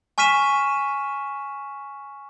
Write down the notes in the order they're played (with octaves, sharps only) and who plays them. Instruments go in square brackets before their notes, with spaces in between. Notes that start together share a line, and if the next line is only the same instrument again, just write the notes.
[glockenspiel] G#5 C#6 F6 B6 D#7 E7